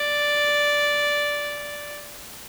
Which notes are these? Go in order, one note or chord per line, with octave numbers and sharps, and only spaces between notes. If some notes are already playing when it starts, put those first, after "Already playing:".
Already playing: D5